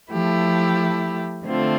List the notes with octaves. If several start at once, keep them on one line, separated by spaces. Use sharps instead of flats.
F3 A3 E4 G4
D3 A3 C4 F4